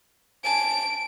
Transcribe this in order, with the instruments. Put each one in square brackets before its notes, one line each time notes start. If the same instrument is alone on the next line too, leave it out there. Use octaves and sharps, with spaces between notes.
[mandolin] G#5 A5 [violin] D7